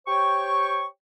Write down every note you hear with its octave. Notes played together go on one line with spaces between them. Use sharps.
G4 C5 C#5 G5 C#6